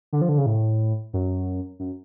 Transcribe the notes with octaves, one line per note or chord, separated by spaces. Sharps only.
D3
F3
D3
C#3
A2
F#2
F#2